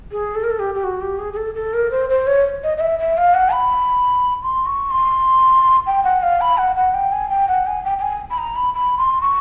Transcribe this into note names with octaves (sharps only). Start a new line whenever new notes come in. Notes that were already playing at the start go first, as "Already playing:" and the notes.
G#4
A4
A#4
A4
G4
G4
F#4
G4
G#4
G#4
A4
A4
A#4
C5
C5
C#5
D#5
D#5
E5
E5
F5
F#5
B5
C6
C#6
C6
G5
F#5
F5
B5
F#5
F#5
G5
G#5
G5
F#5
G#5
G5
G5
G#5
B5
A#5
B5
B5
C6
C#6